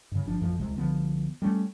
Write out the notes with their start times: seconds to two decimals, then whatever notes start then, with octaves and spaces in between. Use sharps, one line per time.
0.12 G2 C#3
0.26 G1 F3 D4
0.40 A1 F2 F3
0.59 D1 C2 C3 G#3
0.78 C2 D3 F3 B3
1.42 G3 A3 C#4